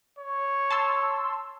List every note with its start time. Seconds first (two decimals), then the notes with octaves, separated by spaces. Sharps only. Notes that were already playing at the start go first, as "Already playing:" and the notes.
0.19 C#5
0.71 A5 C6 E6